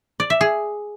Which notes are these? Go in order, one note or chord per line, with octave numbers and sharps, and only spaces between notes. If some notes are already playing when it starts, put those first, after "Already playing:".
D5
E5
G#4